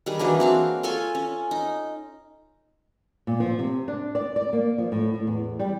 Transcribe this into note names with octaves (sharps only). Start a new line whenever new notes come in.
D#3 G3 G#4
E3 F#3 A#3 D4
C4 F#4 F5
F4 A4 C#5 G#5
C#4
D#4
A#2
F3
C3
D4
D5
D5
A#3
F3
A2
A2
E2
G3